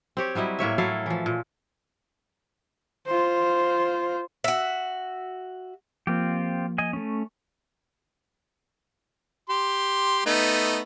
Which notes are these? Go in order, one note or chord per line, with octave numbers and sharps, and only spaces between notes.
C4 G4 C#5
F#3 G3 E4 D#5
A2 A#3 C#5 E5
F#3 E4 A4 F5
E3 F3
A#2
F4 C5
F#4 E5
F3 A#3 C4 F4 G4
D#5 G#5
A3 C#4
G4 C6
A3 B3 D#4